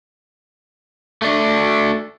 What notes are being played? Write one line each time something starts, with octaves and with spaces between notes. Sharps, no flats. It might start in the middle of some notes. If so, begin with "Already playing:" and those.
A3 D4